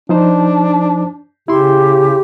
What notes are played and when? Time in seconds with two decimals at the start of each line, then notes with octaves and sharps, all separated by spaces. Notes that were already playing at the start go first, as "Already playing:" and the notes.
0.09 F3 D4 D#4 C5
1.48 C#3 E4 G4 C6